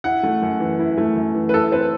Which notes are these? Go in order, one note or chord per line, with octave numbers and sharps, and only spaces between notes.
E4 F#5
A3
F#2
E3
E4
A3
F#2
E3
B4
E4 A4
C4 B4